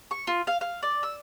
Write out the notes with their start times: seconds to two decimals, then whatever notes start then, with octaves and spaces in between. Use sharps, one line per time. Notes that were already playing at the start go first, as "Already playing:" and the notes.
0.11 C#6
0.27 F4
0.47 F5
0.61 F5
0.83 D5
1.03 E6